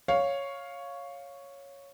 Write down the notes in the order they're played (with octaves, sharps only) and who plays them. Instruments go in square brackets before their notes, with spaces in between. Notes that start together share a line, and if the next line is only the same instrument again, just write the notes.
[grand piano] C#5 F5